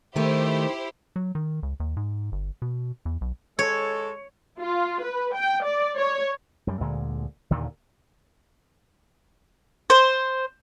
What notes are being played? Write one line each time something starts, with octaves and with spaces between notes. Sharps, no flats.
D#3 A3 E4 G4 C5
F#3
D#3
C#2
D#2
G#2
G1
B2
E2
B1
G#3 A4 C#5
F4
B4
G5
D5
C#5
F#2 G3
D2 A#2 D3 G#3
D#2 A#2 D3 D#3
C5